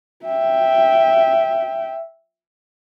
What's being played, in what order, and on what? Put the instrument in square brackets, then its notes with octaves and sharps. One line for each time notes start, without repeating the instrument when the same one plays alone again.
[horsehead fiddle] E5 G5